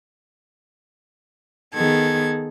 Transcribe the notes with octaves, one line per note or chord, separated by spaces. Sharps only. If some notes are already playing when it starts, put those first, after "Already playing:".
D#3 B3 G#4 A4 G#6